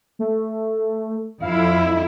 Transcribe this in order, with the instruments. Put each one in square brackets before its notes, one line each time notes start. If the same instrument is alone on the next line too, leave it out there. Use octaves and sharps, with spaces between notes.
[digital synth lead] A3
[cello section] F2 E4 [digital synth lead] F5